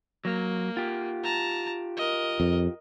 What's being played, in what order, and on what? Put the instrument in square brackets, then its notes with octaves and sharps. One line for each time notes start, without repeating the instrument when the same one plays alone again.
[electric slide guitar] F#3 [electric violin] A#3
[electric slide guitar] F4 G4
[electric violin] A5 A#5
A#4 D#5
[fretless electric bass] F2